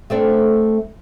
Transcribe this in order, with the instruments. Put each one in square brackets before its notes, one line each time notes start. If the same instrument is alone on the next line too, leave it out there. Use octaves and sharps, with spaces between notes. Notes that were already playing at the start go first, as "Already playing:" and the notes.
[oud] A3 C4 D4